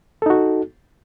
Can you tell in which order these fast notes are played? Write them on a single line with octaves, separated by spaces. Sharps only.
A4 D#4 F#4